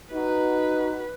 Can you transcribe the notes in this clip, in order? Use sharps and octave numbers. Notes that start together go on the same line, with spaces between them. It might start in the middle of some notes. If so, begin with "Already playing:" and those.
D#4 F#4 B4